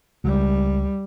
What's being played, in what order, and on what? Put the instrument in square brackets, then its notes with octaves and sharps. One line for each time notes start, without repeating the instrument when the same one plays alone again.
[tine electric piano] C#2 [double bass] G3